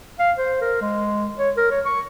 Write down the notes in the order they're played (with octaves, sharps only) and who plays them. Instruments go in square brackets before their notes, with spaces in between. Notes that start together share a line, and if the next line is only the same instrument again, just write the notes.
[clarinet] F5
C5
A#4
G#3
C#5
A#4
C#5
C#6